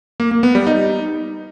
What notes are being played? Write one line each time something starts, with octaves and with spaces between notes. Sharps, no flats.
A#3
A#3
B3
G3
D#4